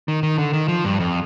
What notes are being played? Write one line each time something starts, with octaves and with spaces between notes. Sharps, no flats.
D#3
D#3
D3
D#3
F3
G2
F2